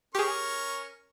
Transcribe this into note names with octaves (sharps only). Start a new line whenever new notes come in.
C#4 G4 G#4 A#4 C#6